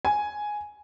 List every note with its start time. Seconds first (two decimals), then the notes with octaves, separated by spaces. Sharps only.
0.05 G#5